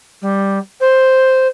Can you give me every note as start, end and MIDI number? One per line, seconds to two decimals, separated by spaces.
0.22 0.58 55
0.80 1.47 72